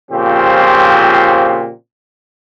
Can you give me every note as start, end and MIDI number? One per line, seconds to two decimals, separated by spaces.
0.10 1.72 46
0.10 1.72 49
0.10 1.72 53
0.10 1.72 60
0.10 1.72 67